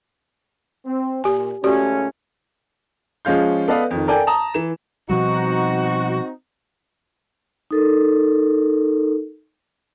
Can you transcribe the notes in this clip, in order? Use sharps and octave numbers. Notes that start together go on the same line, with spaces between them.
C4
A#2 G4 G#5
C#2 A3 C#4 F#4 G4 D5
F3 G#3 C#4 F4 G6
B3 A4 B4 D5 D#5 F5
F2 D#3
A4 A#4 D5 G5 G#5
A5 A#5 D#6
E3 E7
B2 F3 G3 C4 D#4 F#4
D#4 A4 A#4